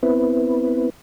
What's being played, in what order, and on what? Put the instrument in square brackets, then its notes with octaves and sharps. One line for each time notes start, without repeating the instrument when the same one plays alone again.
[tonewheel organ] B3 C4 E4 B4